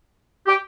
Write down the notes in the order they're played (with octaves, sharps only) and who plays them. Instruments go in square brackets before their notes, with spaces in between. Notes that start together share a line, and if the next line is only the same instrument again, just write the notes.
[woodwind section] G4